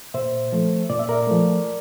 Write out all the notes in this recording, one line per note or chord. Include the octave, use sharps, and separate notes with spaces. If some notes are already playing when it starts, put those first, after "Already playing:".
A#2 C5 E5
F3 A3
A#2 D5
E5
A#4 D5
F3 A3